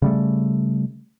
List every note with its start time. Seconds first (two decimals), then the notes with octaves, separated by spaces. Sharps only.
0.02 C#3 G3 A3